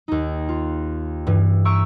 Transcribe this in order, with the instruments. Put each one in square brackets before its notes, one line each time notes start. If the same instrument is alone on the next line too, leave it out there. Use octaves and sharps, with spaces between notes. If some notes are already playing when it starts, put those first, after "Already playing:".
[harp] D#2 D#4
F4
G2 E3
E5 A#5 C#6 E6 D7